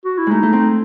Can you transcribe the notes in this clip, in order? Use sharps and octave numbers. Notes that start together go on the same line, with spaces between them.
F#4
E4
G#3 A3 D#4
A3
C4